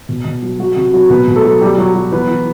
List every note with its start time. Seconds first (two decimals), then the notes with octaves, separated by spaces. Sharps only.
0.09 B2
0.25 B2
0.42 F#3
0.59 F#3 F#4
0.76 C3 F#4
0.93 F#3 F#4
1.10 B2 B3 B4
1.27 B2
1.36 A3 A4
1.44 F#3
1.61 F#3 G3 G4
1.78 F#3 F#4
1.95 F#3
2.12 E3 B3 B4
2.30 E3